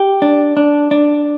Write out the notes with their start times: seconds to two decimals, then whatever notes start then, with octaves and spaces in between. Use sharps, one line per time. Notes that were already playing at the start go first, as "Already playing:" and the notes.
Already playing: G4
0.22 D4
0.57 D4
0.91 D4